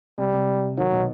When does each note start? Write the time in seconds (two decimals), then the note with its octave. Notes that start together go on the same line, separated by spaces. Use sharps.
0.18 C3 G3
0.33 C3
0.77 D#3 F#3
0.92 B2